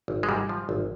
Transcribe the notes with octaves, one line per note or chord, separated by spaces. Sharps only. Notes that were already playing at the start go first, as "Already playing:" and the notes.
G#1
G#3
G#2 G3
F3
G#1